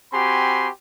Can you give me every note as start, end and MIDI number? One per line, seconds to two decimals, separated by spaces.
0.13 0.69 60
0.13 0.69 66
0.13 0.69 67
0.13 0.69 80
0.13 0.69 83
0.13 0.69 84